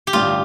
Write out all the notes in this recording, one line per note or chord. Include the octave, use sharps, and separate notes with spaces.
G4
A1 G2 D3 F4